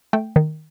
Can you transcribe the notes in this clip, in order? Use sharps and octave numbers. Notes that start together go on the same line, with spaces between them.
A3 G5
D#3